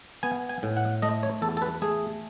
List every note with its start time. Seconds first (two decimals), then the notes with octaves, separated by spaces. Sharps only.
0.23 B3 G#5
0.49 G#5
0.63 A2
0.77 F#5
1.02 A3 D#5
1.23 C#5
1.42 E2 A4
1.57 A4
1.62 B4
1.82 A3 G#4